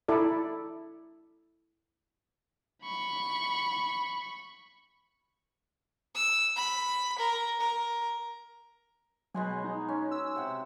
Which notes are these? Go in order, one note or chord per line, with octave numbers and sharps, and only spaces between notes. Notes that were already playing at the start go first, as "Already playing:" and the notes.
E4 A4 D5
B5 C#6
E6
B5
A#4
A#4
B2 F#3 G#3 G#5
D#4
C#4
E6
C3 F#5